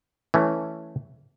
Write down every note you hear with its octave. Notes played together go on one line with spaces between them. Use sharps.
E3 A3 C#4